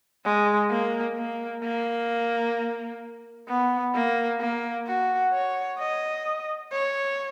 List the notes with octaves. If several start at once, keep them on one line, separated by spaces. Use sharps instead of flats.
G#3
A#3
A#3
A#3
B3
A#3
A#3
F#4
C#5
D#5
C#5